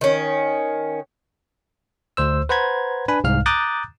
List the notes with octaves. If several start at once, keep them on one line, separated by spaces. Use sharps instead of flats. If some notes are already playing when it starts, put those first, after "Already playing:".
D#3 C#4
D2 C5 E6
B4 C5 F#5 A#5 B5 G#6
D4 B4 G#5 B5
C2 G#2 F5 F6
A#5 D6 D#6 F#6 G6 A6